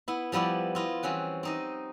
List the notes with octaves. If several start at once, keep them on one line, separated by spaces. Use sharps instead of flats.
B3 E4
F3 G3 B3 E4 D5
E4 F4 D#5
E3 G3 C4 C#4 F#4
C4 D#4 D#5